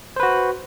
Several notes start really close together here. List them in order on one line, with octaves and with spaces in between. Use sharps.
C5 B4 F#4